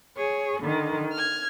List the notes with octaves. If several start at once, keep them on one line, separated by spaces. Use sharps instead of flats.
G#4 C#5
D3 D#3
F6 G#6